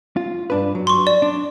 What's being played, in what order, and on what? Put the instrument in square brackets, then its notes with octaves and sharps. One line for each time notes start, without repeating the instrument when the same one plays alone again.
[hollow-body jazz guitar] F4
G2 D4 B4
F#3
[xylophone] C6 C#6
D5
[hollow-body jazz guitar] D4